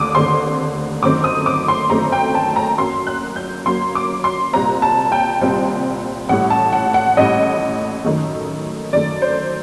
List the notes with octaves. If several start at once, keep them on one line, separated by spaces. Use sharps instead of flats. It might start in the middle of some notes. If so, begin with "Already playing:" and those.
Already playing: D#2 D3 A3 D6 D#6
D#2 D3 A3 C4 C6
G1 F#2 D#3 A3 C4 D6
D#6
D6
C6
G1 F#2 D#3 A3 C4 A#5
G5
A5
A#5
F#2 F#3 A#3 C6
F#6
G6
F#2 F#3 A#3 C6
D6
C6
C2 A#2 G3 C4 A#5
A5
G5
C2 A#2 G3 C4
A1 A2 G3 F#5
A5
F#5
F#5
A1 A2 G3 D#5
F#2 D#3 A3
F#2 D#3 A3 D5
C5